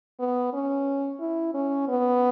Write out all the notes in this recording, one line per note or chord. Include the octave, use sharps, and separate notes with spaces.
B3
C#4
E4
C#4
B3